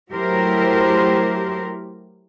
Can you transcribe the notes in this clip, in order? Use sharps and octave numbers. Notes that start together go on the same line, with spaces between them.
F#3 A3 E4 G4 A#4 C5